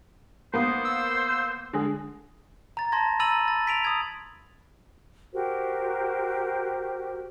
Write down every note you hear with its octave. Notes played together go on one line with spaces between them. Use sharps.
A#3 B3 C5 D#6
E6
D3 G#3 G#4
A#5 A6
A5 C6 G#6 A#6
A#5 B5 E6 A6 D#7 F#7
A6
B6 D7 F7
D#6 G#6
F#4 G4 A#4 C5